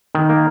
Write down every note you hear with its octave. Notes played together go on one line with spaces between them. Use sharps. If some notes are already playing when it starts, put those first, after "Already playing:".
D#3
A#3